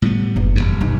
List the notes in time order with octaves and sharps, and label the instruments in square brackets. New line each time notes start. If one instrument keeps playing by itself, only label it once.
[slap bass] A2 G3 B3
[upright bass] F#1 E2
[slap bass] D#1 G#1 G2
[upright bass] B1 D#4